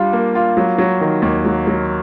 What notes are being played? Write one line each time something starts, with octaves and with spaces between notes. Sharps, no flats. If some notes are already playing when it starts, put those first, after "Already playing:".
Already playing: G3 D4 F4
A#3
F4
F#3
F#3
D#3
D#2
F#3
F#3